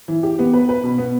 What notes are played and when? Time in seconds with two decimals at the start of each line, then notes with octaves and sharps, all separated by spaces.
0.08 E3
0.23 G4
0.39 B3
0.53 B4
0.69 B4
0.83 B2
0.98 B3